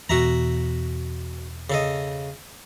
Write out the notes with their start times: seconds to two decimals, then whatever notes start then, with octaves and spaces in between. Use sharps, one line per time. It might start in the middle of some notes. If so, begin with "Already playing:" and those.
0.09 E2 B2 F#4 E5 A#5
1.70 C#3 A4 D#5